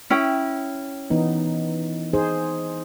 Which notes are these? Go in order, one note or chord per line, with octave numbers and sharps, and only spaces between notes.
C#4 E4 G5
E3 B3 D#4
D#4 G#4 C5